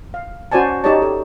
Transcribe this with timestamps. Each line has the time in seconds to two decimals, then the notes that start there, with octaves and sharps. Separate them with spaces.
0.14 F5
0.52 C#4 F#4 C5 D5 G#5 A5
0.84 D#4 G4 G#4 C#5 D5 A5
1.02 A4